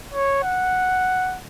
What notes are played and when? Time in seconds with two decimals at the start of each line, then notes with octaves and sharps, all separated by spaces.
0.13 C#5
0.43 F#5